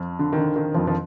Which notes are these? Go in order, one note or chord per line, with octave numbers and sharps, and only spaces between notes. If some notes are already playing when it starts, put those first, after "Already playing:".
Already playing: F2 F3
D3
D#3
D3
D#3
F2 F3
F3